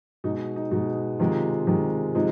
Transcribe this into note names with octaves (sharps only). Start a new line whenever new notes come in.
B2 G#3 D#4
D#4
B2 G#3 D#4
C3 D#3 G#3 F4
C3 D#3 G#3
C3 F3 G#3 D#4